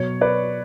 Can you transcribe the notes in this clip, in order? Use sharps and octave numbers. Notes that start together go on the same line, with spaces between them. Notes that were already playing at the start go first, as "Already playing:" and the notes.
Already playing: B2 F#3 C#5
B4 D5